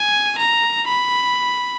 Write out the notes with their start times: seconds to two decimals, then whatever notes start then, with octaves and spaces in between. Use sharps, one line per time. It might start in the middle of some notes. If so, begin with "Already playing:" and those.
Already playing: G#5
0.38 A#5
0.88 B5